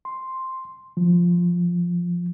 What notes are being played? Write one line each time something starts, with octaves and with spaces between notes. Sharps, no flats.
C6
F3